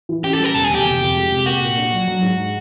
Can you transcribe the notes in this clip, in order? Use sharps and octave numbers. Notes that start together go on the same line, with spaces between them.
E3
C#4 G4
A4
G3 A#4
E1 A4
G#4
D2
G4
F1
F2
G#3
C3
A#3 F#4
A#2
D4
F#3
F#3
G#2